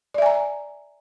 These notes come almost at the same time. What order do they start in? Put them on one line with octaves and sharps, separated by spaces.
D5 E5 G#5 A#5